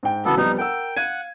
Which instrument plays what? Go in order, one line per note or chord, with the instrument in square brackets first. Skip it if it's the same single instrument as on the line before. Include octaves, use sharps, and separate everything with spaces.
[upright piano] G#2 G5
[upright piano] A1 C#3 F#3 [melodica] B3 A4
[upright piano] F2 G3 B3 [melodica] D#4
[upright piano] A#4 F#5 E6 [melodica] G5
[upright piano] F5 G#6 D#7 [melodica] F#5